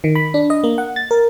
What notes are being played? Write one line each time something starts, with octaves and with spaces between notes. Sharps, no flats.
D#3
B5
D4
D#5
A#3
F#5
A6
A#4